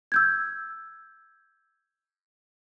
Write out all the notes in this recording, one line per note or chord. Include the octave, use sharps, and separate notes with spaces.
E6 G6 G#6